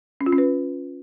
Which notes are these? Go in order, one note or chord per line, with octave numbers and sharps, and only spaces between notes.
C#4
F4
C#4
B4